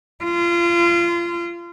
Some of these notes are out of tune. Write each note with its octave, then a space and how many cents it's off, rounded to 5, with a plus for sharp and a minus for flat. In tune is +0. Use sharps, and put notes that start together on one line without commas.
F4 -25